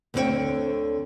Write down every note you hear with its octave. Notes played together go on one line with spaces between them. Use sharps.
D2 D3 C4 C#4 C#5 G5